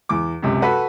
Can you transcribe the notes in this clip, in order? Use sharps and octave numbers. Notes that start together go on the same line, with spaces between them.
E2 D6
C#2 F#2 C3
F#4 A4 B4